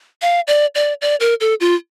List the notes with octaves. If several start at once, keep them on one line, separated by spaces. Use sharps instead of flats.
F5
D5
D5
D5
A#4
A4
F4